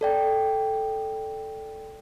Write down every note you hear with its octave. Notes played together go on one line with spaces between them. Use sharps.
A4 D5 G5